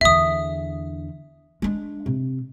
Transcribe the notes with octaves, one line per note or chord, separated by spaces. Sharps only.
E2 D3 E5 D#6
G#3 D4
C3